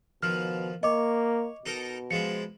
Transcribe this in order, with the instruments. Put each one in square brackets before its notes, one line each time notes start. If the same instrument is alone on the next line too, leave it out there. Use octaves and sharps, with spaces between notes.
[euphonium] B2 [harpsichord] D#3 F3 [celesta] F6
[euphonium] A#3 [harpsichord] C#5 [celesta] D#5 D6
[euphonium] B2 [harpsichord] D#4 A4 A#4
[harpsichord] F3 G#3 E4 [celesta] C#7